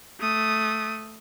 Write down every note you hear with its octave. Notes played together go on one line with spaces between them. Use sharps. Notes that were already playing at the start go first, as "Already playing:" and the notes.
A3 D#6